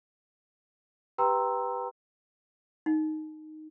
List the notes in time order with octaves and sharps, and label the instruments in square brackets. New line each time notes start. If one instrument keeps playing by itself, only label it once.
[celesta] G4 B4 G5 A#5 C6 E6
[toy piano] D#4